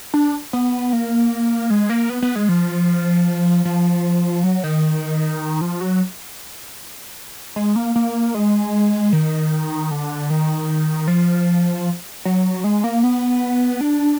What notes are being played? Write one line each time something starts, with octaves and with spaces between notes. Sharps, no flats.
D4
B3
A#3
G#3
A#3
B3
B3
G#3
F3
F3
F#3
D#3
F3
F#3
G#3
A#3
A#3
G#3
D#3
D3
D#3
F3
F#3
G#3
A#3
B3
D4